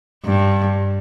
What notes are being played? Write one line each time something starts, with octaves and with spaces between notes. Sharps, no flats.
G2